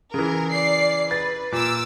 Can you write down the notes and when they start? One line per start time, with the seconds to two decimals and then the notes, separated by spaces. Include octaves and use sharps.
0.14 C#3 E3 A#4
0.51 D5 C7
1.11 B4 A6
1.52 A#2 D6 E6